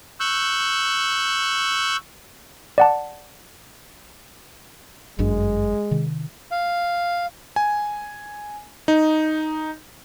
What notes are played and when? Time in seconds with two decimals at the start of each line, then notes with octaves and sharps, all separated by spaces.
0.20 C#6 E6 F#6 G6
2.78 D5 F#5 A5
5.19 G1 F#2 G#3 D4
5.91 C3 D#3
6.51 F5
7.56 G#5
8.88 D#4